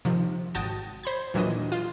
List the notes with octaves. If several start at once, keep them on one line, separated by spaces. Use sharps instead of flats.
C3 D#3 F3
G#1 F#4 G5 A5 D#6 A#6
C5 B5 G#6
D#2 A#2 E3 F#3 D4 D#5
F4